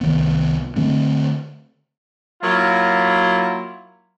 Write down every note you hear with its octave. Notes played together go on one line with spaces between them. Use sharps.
C2 D#3 B3
D3 A3 C4
F#3 A#3 E4 F4